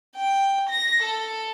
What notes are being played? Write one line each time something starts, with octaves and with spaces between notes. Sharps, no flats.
G5
A#6
A4